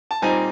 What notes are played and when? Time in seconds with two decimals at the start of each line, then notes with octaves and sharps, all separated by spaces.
0.11 A5
0.22 A#2 G3 C4 D#4 G#5 A#5